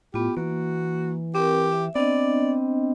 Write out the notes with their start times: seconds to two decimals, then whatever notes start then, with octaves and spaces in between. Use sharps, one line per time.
0.14 A2 B3 F4 G4
0.37 E3 A#3 F#4
1.35 C4 G4 A#4
1.72 E5
1.95 B3 C4 D4 D5 D#5